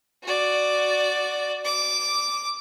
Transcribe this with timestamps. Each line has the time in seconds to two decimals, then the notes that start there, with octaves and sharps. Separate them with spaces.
0.23 F#4 D5
1.65 D6